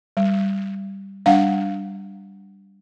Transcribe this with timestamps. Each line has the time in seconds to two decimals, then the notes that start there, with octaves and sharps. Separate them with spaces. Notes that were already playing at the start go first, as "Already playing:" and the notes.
0.17 G3
1.26 G3 D4 F5 F#5